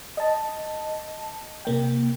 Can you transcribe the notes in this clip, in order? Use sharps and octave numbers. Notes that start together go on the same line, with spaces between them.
D#5 A5
C3 A#3 G5